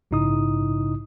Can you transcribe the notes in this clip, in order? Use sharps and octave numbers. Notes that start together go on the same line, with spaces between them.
A#1 G#2 C#3 D#4 E4 D#6